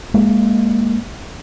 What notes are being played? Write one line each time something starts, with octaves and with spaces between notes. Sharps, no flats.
G#3 A#3